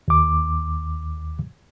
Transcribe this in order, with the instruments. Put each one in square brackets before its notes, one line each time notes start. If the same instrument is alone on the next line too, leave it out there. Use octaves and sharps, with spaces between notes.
[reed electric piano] D#2 D6